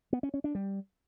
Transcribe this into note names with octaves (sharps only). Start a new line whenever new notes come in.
B3
C#4
C#4
D4
G3